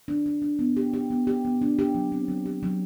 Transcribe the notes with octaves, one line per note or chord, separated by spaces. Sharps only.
D4
D4
D4
B3
G4
G4
B3
G4
B3
D4
G4
F#3
C4
F#3
G4
F#3